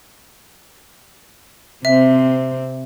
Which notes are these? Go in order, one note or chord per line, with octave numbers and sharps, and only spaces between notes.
C3 C4 E5